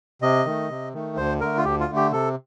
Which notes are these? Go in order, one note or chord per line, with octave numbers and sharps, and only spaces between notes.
C3 D#5
D#3 A3
C3
D#3 A3
D2 C5
D3 A3 A#4
F4
D2 G4
F4
D3 A3
G4
C3 A4